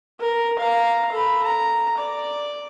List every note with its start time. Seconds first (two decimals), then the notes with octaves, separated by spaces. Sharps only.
0.20 A#4
0.58 F5 A#5
1.12 A4 B5
1.43 A#5
1.97 D5